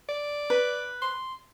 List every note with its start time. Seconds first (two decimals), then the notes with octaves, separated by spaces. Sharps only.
0.09 D5
0.50 B4
1.02 C6